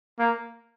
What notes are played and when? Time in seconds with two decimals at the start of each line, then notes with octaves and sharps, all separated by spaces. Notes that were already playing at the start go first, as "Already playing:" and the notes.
0.19 A#3